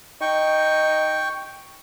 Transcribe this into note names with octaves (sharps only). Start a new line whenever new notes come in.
D#4 G5 C#6